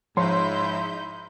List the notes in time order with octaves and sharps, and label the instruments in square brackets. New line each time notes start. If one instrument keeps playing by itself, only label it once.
[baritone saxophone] G#2 [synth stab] F3 C#5 [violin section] D#4 E4 G6 [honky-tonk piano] C6